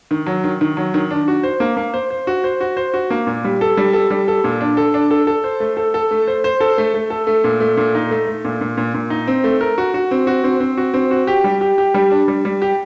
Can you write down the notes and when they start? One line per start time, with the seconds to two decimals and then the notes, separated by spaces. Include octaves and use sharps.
0.11 D#3
0.26 F#3
0.44 D#3
0.61 D#3
0.77 F#3
0.94 D#3
1.11 D4
1.28 F#4
1.43 C5
1.60 A#3
1.77 A#3
1.94 C5
2.10 C5
2.27 F#4
2.44 C5
2.61 F#4
2.77 C5
2.94 F#4
3.10 A#3
3.27 A#2
3.44 G3
3.61 A4
3.77 G3
3.93 A4
4.10 G3
4.28 A4
4.44 A#2
4.61 D4
4.77 A4
4.94 D4
5.11 A4
5.27 A4
5.44 C5
5.60 A3
5.77 A4
5.94 A4
6.11 A3
6.27 C5
6.44 C5
6.60 A4
6.78 A3
6.94 A3
7.10 A4
7.27 A3
7.44 A#2
7.60 A3
7.77 A#2
7.95 D#4
8.11 A3
8.27 A3
8.45 A#2
8.61 A#2
8.77 A#2
8.94 A#2
9.10 D#4
9.27 C4
9.44 A3
9.61 A#4
9.78 F#4
9.94 F#4
10.11 C4
10.27 F#4
10.44 C4
10.60 C4
10.77 F#4
10.94 C4
11.11 F#4
11.27 G4
11.44 G3
11.61 G4
11.78 G4
11.94 G3
12.11 D4
12.28 G3
12.45 G3
12.62 G4